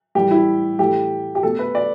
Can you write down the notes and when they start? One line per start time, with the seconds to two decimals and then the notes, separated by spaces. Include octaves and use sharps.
0.15 A2 E3 G3 G4
0.31 E4
0.79 A2 E3 A3 G4
1.35 G4
1.43 B2 A3 A4
1.59 B4
1.75 D5